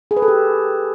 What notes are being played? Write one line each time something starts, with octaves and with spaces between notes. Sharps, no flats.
G#4
B4
A4
G4